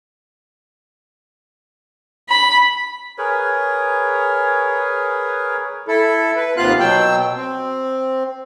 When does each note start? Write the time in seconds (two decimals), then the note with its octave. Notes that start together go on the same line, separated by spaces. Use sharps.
2.29 B5
3.18 G#4 A#4 B4 C#5
5.88 E4 A4
6.36 B4
6.57 D#2 C3 B3 F4 F5 F#6
6.80 B2 F#3 G5 E6
7.36 C4